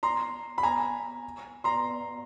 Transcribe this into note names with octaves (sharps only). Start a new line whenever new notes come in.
A#5 C6
B5
G#5 A#5
A#5 C6